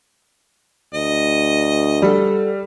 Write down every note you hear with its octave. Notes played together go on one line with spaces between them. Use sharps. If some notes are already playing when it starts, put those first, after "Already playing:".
D2 D#5
G3 A4 F#5